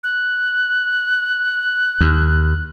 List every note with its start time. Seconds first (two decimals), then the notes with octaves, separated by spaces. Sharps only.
0.04 F#6
2.01 D#2